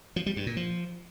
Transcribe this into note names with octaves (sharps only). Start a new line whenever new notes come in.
F3
G3
G2
A#2
F3